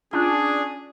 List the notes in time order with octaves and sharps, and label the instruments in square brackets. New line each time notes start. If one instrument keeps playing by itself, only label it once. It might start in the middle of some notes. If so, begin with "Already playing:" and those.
[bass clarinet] C#4 [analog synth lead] D4 [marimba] F4 [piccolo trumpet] G#4